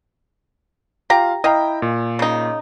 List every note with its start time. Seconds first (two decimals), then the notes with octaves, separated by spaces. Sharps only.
1.10 F4 G4 F5 A#5
1.44 E4 D#5 F5 G5 A#5
1.82 A#2
2.19 C#3 D#4